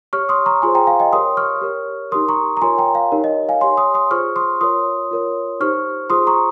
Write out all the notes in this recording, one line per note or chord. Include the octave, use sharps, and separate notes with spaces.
G4 C#5 C#6 F6
C6 D#6
A#5 C#6
F4 G#4 C5 G#5 C6
G5 A#5
F5 G#5
D#5 G5
G4 A#4 C#5 C6 D#6
C#6 F6
G4 A#4 C#5
D#4 G4 A#4 C6 D#6
A#5 C#6
A#5
F4 A#4 C#5 G#5 C6
G5 A#5
F5
D#4 G4 A#4 C#5
D#5
F5 G#5
G4 C#5 G#5 C6
C6 D#6
C6 D#6
F4 G#4 C5 C#6 F6
C6 D#6
F4 A#4 C#5 C6 D#6
F4 A#4 C#5
D#4 G4 C5 C#6 F6
F4 G#4 C5 C6 D#6
A#5 C#6